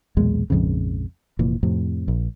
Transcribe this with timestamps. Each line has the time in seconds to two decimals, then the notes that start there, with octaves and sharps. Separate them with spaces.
0.17 B1 E2 A#2 G#3
0.50 A#1 F2 G#2 C#3
1.39 F1 A#2 E3
1.63 F2 A2 C3
2.08 A#1